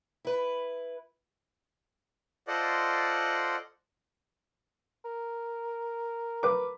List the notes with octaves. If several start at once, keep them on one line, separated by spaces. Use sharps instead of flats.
E4 B4
F4 A4 C5 D5 D#5 F#5
A#4
B4 D6